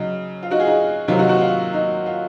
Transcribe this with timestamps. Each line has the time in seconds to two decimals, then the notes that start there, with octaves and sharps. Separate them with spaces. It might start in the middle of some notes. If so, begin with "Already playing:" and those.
Already playing: C#3 F#3 D#4
0.43 F4
0.51 D#4 F#4
0.60 F4 G#4
0.67 D#4
1.08 C3 D#3 F#3 F4
1.19 D#4 F#4
1.29 D#4 F#4
1.41 F4
1.73 D#4
2.06 F4